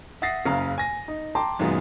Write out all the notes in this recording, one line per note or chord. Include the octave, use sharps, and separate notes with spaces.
E5 F#5 D#6 A6 A#6 C7
F#1 C#3 F5 A#5
G#5 A#6
D#4
G5 A5 A#5 C6 D6
F#2 A#2 D#3 G#3 B3 F4